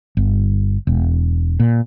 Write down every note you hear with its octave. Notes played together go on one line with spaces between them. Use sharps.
G1
E1
A#2